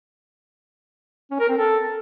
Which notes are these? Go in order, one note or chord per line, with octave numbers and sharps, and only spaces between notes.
C#4
A#4
C4
A4